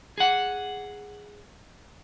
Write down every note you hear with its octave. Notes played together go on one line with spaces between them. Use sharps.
G#4 F#5